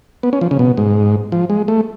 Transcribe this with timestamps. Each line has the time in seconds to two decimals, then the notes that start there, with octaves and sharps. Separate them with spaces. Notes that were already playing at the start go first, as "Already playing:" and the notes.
0.23 B3
0.33 C#4
0.41 F3
0.51 C#3
0.59 B2
0.77 G#2
1.32 F3
1.50 G#3
1.68 A3